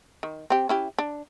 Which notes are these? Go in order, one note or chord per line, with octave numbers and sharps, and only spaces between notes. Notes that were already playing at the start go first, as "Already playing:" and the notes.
D#3
C4 G4
C#4 E4 G4
D4